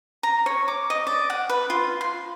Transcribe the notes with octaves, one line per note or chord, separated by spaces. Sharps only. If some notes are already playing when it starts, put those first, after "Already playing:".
A#5
C#5
D6
D#5
D5
F#5
B4
F4
C6